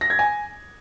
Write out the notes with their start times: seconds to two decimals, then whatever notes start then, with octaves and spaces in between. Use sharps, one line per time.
0.01 A#6
0.10 G#6
0.19 G#5